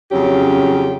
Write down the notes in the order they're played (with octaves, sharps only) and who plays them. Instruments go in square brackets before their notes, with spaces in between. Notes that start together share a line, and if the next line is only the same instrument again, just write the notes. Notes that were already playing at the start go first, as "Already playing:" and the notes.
[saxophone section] F2 C#3 F#3 C#4 G4